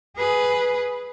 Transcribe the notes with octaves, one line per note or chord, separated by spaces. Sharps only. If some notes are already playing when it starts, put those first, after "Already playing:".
G#4 B4